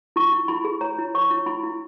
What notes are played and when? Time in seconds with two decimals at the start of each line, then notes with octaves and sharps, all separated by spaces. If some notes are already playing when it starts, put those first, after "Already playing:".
0.16 E4 C#6
0.33 E4
0.48 E4 B5
0.65 G#4
0.81 C#5 A#5
0.98 E4
1.15 C#5 C#6
1.30 E4
1.46 E4 B5
1.63 E4